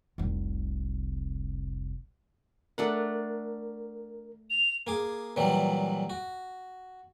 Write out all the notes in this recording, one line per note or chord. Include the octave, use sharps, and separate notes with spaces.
F1 C2
A3 D4 A#4 F#5
F7
A#3 G#4 D6
A#2 E3 F#3 G3
F#4